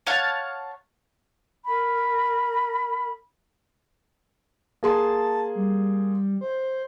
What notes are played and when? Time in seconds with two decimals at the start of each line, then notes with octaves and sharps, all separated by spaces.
0.07 C#5 F5 F#5 A5
1.65 A#4 B5
4.83 A#3 G#4 A5 C6
5.55 G3
6.41 C5